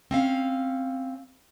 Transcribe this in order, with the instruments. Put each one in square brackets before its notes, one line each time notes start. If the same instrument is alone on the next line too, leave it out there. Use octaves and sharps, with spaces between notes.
[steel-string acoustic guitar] C4 C#4 F5